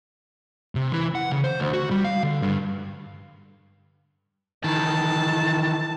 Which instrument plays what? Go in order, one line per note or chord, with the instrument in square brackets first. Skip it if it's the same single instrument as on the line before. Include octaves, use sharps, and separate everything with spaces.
[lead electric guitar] C3
E3
F#5
C#3
C5
D2
F#4
G3
F5
D3
G2
[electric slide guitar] D#3 E3 [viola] A5